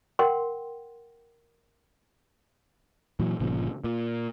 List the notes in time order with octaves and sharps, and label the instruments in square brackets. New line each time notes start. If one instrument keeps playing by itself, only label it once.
[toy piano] A#4 F#5 G5 C6
[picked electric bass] A#2 E3 F#3
G1 A#2 C#3 F3
A#2